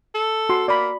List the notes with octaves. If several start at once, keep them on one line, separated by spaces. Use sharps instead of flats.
A4
F#4 C6
A#3 D5 B5